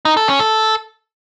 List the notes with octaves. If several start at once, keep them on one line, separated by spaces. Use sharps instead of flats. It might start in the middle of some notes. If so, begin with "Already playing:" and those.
D#4
A4
C#4
A4